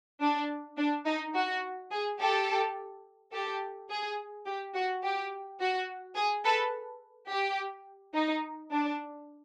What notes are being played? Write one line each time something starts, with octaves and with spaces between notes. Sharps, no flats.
D4
D4
D#4
F#4
G#4
G4 A4
G4 A4
G#4
G4
F#4
G4
F#4
G#4
A4 B4
G4
D#4
D4